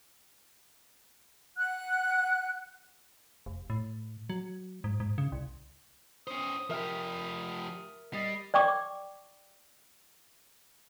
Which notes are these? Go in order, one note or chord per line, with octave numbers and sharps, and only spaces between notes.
F#5 F#6
F1
A2
F#3
G#2
G#2
C#3
C2
C#4 C5 D#6
F3 G4 A#4 E5 F6
G3 D#5 A6 C7
D5 G5 C#6 D6